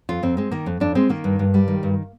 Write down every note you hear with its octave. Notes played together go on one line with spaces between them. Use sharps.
F2 F4
F2 C4
G#3 C4
D#3 A#3
F2
F2 D4
G#3 C4
D#3 A#3
G2
G2
G3
D#3
G2